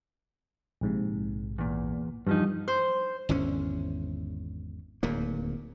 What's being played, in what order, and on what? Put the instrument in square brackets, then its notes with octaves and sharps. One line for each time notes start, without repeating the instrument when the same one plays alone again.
[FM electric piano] A#1 G#2 C3
[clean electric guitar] E2 A#2
[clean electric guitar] E2 F3 D#4 [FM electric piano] G2
[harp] C5
[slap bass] G#1 E2 D3 C#4
D1 D#2 A#2 A#3